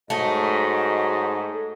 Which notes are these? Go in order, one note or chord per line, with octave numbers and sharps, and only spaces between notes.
G#2 F#3 A3 F#4 D#5